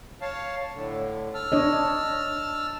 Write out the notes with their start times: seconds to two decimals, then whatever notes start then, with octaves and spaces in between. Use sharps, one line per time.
0.22 C#5 F5 A5
0.73 A2 D3
1.34 A5 E6 F6
1.52 D4 C#5 D#5